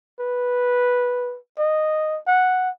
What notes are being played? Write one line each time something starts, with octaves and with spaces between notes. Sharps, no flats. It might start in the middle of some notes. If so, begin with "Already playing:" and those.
B4
D#5
F#5